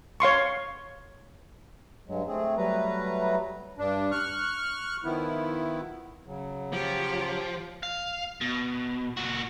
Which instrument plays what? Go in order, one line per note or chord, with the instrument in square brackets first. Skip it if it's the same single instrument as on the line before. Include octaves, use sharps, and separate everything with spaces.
[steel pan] C#5 F5 C6 C#6
[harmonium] G2 F#3 G#3
A3 C4 G#4
F#3 G3 A3 B4 A#5
[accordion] G2 D4
C#6 F6 F#6
D#3 F3 B3 E4
[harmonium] C#3 F#3
[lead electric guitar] F3 [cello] G4 C#5
[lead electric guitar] F5
B2
A#2 F#4